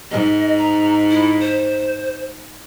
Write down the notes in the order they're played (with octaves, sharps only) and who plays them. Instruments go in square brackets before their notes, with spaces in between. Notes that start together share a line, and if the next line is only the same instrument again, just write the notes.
[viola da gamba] G#2 [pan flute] D#5
[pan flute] A#5
E4
C5